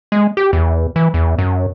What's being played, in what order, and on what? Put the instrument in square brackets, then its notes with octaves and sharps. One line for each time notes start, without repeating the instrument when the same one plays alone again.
[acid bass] G#3
G4
E2
E3
E2
F#2